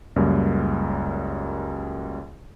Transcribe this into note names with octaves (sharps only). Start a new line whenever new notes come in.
C#2 F#2 G3 A#3